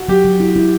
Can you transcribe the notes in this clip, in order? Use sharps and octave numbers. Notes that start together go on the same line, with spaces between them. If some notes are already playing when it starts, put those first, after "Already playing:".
Already playing: F#4
F#3 G4
F#3
E4
E4